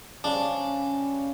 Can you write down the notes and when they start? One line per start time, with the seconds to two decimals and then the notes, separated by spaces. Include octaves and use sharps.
0.24 C#3 G3 C#4 D4